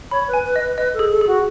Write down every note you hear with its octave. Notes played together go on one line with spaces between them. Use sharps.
C#5 B5
B4
G#5
B4
D#5
B4
B4 D#5
A4
G#4
A4
G#4
F#4